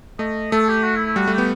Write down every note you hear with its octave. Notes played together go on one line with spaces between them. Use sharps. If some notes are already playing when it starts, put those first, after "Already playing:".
A3 D#5
A3 A4
G4
F#4
E4
E4
G3 F#4
A3
G4
B3